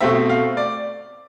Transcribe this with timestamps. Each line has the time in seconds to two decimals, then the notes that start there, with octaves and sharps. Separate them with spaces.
0.01 B2 A3 C4 E5
0.29 F5
0.57 D5